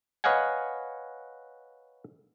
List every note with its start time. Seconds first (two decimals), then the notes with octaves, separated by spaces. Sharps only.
0.24 B4 C#5 D#5 F5 F#5 G#5